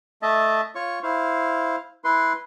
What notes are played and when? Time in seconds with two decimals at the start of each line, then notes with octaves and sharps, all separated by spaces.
0.22 A3 D#5 E5 A5
0.75 F4 C#5 C#6
1.03 E4 C5 F5
2.04 E4 B4 C6